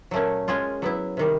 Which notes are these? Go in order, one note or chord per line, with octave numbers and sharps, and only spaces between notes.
A#2 F#3 A3 C#4
G#3 C#4 F4 G#4
F#3 B3 E4
C3 D#3 G3